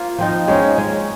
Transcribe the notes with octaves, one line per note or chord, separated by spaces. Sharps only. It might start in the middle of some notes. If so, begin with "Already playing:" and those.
Already playing: A#3 F4 C5
F3 C4 D#4
G#3 C#4 D#4 G#4
G#3 C#4 G#4